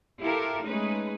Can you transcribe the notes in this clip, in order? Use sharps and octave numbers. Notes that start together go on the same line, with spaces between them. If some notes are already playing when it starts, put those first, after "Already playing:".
E4 F4 G4 A4 A#4
G#3 A3 C#4 D#4 G#4 B4